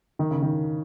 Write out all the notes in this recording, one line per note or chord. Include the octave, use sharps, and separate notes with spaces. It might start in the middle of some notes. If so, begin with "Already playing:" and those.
D#3
C#3
D#3